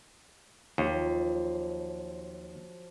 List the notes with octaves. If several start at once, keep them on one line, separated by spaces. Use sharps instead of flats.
D#2 F3 F#3